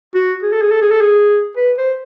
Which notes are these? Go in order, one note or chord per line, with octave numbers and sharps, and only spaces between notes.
F#4
G#4
A4
G#4
A4
G#4
A4
G#4
B4
C5